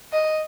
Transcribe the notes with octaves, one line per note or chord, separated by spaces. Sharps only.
D#5